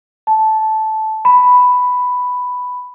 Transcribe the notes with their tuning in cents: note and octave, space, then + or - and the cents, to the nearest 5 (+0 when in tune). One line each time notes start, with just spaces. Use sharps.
A5 -10
B5 +5